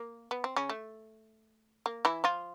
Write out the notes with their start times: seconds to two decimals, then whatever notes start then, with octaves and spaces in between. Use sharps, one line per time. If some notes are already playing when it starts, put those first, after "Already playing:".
Already playing: A#3
0.31 B3
0.44 C4
0.56 C#3 C#4
0.70 A3
1.86 A#3
2.05 E3 E4
2.24 F3 F4